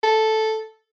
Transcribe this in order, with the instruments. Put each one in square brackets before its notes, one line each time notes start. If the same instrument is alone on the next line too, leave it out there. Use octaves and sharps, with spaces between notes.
[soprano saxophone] A4